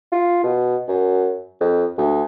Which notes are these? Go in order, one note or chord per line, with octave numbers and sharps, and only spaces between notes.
F4
B2
F#2
F2
D2